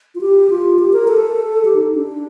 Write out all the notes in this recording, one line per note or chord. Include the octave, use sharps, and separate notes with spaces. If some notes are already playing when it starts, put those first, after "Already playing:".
F4
G4
F4
G4
A#4
A4
G4
D#4
D4